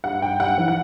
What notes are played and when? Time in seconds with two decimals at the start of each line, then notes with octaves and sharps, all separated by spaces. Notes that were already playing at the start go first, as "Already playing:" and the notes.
0.04 G2 F#5
0.22 G2 G5
0.40 G3 F#5
0.58 E3
0.68 F#5